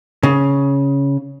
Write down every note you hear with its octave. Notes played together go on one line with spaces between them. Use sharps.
C#3